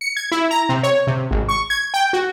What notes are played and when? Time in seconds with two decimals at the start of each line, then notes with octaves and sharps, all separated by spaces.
0.01 C#7
0.17 G#6
0.32 E4
0.51 A#5
0.69 C3
0.83 C#5
1.07 C3
1.31 G#1
1.49 C#6
1.70 G#6
1.94 G5
2.13 F#4